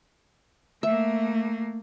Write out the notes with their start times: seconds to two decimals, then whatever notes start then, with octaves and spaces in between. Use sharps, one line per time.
0.83 A3 A#3 E5